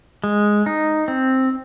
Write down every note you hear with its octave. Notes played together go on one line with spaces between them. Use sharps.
G#3
D#4
C4